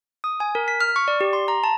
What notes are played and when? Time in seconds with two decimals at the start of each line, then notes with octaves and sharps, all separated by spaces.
0.24 D#6
0.40 G#5
0.55 A#4
0.68 B6
0.80 F6
0.96 C#6
1.08 D5
1.21 G4
1.33 C6
1.48 A#5
1.64 A5